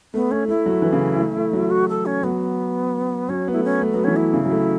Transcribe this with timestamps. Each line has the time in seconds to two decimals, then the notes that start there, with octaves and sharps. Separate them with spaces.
0.14 A3 B3
0.31 A3 C#4
0.48 A3 E4
0.66 F#3
0.82 E3
0.92 C#3
1.19 A3
1.37 A3
1.53 F#3
1.71 F#4
1.89 A4
2.06 C#4
2.23 F#3 B3
3.29 F#3 C#4
3.47 B3
3.52 A3 E4
3.64 C#4
3.81 A3
3.92 F#3 B3
4.04 E3 C#4
4.16 E4
4.33 C#3
4.45 F#3
4.51 A3